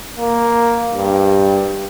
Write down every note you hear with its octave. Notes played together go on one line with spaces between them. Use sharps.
A#3
G2